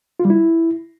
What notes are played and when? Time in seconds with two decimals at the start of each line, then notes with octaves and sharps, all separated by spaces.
0.20 F4
0.25 G3
0.30 E4